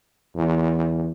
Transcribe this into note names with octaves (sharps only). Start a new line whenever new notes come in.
E2